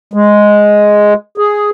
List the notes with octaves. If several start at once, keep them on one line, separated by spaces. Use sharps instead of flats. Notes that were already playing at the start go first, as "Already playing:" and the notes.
G#3
G#4